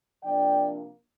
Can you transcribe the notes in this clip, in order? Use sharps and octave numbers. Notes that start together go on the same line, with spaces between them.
C3 F3 A#3 D4 D5 G5